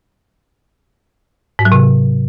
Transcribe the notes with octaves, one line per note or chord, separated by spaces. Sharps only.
G#2
F#3
C3